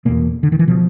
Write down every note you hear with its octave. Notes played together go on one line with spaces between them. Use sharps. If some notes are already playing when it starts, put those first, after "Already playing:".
E2 B2 A#3
D3
D#3
E3
B2 F3